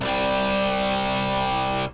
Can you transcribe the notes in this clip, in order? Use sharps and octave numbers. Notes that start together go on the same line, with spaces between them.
C2 G3